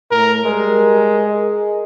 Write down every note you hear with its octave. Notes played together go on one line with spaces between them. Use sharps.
A2 A#4
G3 G#3 A#4
G#4 A#4 D#5